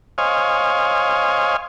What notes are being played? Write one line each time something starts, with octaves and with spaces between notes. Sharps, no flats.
C5 C#5 D#5 F5 G#5